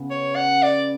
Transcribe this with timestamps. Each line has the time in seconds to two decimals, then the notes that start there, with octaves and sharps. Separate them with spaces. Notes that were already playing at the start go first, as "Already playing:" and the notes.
Already playing: C#3 B3
0.10 C#5
0.36 F#5
0.63 D5